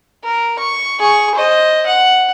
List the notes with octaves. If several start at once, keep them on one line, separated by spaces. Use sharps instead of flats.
A#4
C#6
G#4 C#6
C5 D#5
F#5